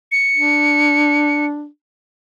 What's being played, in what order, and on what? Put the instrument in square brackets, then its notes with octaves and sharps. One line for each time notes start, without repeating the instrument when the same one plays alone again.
[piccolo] C#7
[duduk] D4